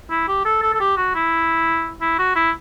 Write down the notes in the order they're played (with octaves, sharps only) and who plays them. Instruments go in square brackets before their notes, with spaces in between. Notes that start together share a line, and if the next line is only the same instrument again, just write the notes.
[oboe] E4
G4
A4
A4
A4
G4
F#4
E4
E4
F#4
E4